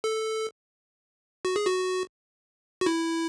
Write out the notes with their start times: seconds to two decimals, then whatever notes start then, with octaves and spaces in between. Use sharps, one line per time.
0.04 A4
1.45 F#4
1.56 G#4
1.67 F#4
2.81 F#4
2.86 E4